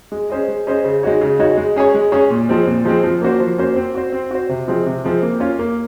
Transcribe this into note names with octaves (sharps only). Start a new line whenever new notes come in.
G#3
C#4 G#4 C5 D#5
G#3
C#4 G#4 C5 D#5
C#3
G#3 D#4 F#4 C#5
C#3
G#3 D#4 F#4 C#5
G#3
C#4 G#4 C#5
G#3
C#4 G#4 C#5
A#2
F3 G#3 C4
A#2
F3 G#3 C4
F3
A#3 C#4 F#4 C5
F3
A#3 C#4 F#4 C5
C4
F#4 C5
C4
F#4 C5
C3
F3 G#3 C4
C3
F3 G#3 C4
A#3
C#4 F4
A#3